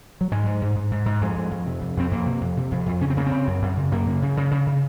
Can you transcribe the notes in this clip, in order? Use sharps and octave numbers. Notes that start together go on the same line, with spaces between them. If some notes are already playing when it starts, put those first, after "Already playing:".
F#3
G#2 G#3
G#2
G#2
G#2
G#2
G#2
F2 G#3
F2
F2
C3
F2
F2 C4
F2 A#3
C3
F2
C3
F2
F2
C#3 C#4
C4
C#3 A#3
C4
C#3
F#2
F#2
C#3
F#2 A#3
C#3
C#3
C#3
C#3
C#3